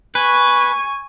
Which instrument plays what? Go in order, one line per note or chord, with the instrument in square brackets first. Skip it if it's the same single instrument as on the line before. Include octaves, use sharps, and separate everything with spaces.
[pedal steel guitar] B4 [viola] G#5 C#6